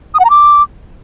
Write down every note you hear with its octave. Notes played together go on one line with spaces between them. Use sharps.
D#6
F#5
A#5
D6